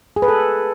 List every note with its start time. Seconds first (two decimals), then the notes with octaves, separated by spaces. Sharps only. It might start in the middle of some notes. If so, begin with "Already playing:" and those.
0.16 G#4
0.22 B4
0.28 A4